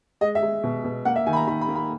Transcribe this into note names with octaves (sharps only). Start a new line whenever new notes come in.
G#3 D#5
E5
G#3
B2
B2
A#3 F#5
E5
D#3 G#5
B5
A#5
D#3 B5
B5
A#3
B5